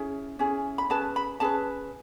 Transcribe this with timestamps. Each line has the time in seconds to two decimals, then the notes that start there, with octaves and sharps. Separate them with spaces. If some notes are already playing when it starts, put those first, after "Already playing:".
Already playing: C#4 E4 G#4
0.39 C#4 E4 G#4
0.78 B5
0.90 C#4 G#4 B4 A5
1.16 B5
1.40 C#4 G#4 B4 A5